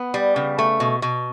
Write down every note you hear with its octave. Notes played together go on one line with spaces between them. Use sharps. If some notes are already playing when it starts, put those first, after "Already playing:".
Already playing: B3
G3
C#3
A3
B2
B2